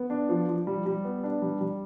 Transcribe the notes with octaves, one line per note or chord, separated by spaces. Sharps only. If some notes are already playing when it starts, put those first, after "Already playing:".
Already playing: B3
D4
F3
F3
G3
G3
B3
D4
G3
G3